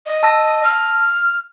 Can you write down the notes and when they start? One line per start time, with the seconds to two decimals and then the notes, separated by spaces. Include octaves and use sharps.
0.06 D#5
0.23 A5 E6 A#6
0.63 F6